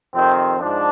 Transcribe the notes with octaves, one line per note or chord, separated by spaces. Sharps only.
F2 C3 D#3 C4
G#2 F3 D4